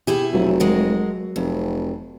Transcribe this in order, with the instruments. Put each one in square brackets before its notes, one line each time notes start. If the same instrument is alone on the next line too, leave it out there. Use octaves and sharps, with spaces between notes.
[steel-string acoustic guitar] B2 E4 G#4 [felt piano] G4
[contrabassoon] F1 [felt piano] F#3
[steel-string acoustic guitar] G#3 F#4 A#4
[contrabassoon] F1 [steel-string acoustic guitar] F2